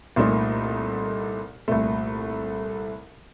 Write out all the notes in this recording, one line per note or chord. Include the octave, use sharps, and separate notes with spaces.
C2 A#2 A3 D#4
C2 A#2 A3